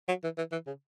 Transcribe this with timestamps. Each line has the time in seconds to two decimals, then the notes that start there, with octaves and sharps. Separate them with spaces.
0.08 F#3
0.24 E3
0.38 E3
0.52 E3
0.67 C#3